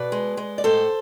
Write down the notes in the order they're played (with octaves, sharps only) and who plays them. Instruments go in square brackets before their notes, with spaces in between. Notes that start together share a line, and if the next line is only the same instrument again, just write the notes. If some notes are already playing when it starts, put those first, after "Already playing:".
Already playing: [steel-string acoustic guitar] B2 B4 D5
G#3
G#3
D5
A2 A4 C5